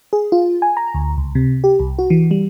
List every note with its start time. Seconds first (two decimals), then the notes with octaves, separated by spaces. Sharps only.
0.13 G#4
0.32 F4
0.62 G#5
0.77 A#5
0.94 D2
1.18 C#2
1.35 C3
1.64 G4
1.80 C2
1.99 F#4
2.10 E3
2.31 G3